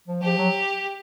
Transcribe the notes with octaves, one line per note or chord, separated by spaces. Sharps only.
F3
F3 G4
F#3